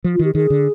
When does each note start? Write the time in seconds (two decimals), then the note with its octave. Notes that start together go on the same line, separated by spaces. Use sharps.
0.04 F3
0.14 F4
0.19 D#3
0.25 G4
0.35 D#3 G#4
0.50 D3